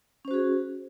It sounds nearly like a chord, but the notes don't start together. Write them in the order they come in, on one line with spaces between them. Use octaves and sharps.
C#4 C5 F#4 G#4